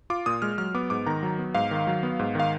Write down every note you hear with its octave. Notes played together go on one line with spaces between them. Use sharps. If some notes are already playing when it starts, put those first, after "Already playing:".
F4 D6
A#2 D#6
G#3 F6
F#3 F6
B3 D6
G#2 D6
D#3 A#5
F#3
B3
G#2 F5
D#3
F#3
B3
G#2
D#3 F5